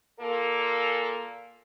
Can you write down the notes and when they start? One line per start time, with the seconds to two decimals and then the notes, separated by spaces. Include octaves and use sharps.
0.19 A#2 A#3 A4